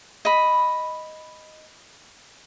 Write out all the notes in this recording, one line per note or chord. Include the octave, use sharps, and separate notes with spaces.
D#5 B5